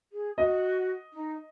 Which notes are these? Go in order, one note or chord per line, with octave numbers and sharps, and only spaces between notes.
G#4
F#4 D#5
D#4